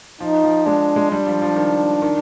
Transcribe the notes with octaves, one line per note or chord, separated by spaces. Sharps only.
F3 D#4
F3
G#3 D4
G#3
G3 D4
F3
F3
D#3
D#3